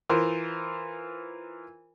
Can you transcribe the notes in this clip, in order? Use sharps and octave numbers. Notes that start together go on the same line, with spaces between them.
E3 F4 A#4 C5